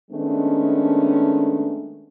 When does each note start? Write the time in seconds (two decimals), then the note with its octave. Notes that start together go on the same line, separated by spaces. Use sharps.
0.11 D#3 G#3 A3 B3 C#4 D4